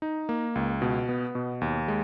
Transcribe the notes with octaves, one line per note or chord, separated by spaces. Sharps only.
D#4
A#3
C#2
B2
B3
B2
D#2
G#3